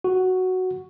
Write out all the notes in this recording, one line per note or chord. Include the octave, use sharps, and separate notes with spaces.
F#4